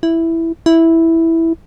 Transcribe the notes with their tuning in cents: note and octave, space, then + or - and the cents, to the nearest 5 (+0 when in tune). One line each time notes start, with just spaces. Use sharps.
E4 +0
E4 -5